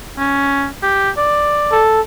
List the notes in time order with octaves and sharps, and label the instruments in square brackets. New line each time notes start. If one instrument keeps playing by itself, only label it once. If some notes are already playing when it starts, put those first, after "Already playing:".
[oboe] C#4
G4
D5
[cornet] A4